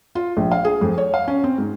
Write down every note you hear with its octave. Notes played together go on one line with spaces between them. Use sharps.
F4
A#1
F5
G#4
F2
C#5
F5
C#4
C4
G#2